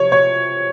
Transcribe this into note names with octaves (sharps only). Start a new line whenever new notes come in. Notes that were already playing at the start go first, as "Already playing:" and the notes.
Already playing: C3 F3 C#5
C#5